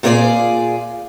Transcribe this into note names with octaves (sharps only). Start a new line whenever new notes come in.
A#2 F4 G#4 C#5 D5